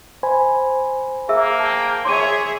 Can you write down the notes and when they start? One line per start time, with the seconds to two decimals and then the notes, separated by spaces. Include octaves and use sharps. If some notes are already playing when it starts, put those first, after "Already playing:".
0.23 C5 G#5 B5
1.29 A#3 G#4 E5 E6
1.60 G#4 G5 A5
2.05 G#4 C#5 E5 C6 D6 D#7